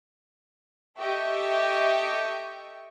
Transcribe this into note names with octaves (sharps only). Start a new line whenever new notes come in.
G4 A4 D#5 E5 G5 C#6